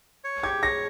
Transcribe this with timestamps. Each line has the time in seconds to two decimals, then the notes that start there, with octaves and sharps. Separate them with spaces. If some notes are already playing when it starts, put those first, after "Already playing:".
0.24 C#5
0.43 G4 G#6
0.62 C#5 A#6